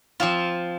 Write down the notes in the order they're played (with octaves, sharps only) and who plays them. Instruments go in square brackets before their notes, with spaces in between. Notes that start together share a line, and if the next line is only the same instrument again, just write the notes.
[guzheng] F3 C4 F4